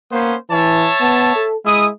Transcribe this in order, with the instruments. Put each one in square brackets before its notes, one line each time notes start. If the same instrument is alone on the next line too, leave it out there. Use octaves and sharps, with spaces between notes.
[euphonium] A#3 [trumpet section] B3 C#4 C5
[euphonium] E3 [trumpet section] C#5 E5 A5
[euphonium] B3
A4
[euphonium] G#3 [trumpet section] E4 D#6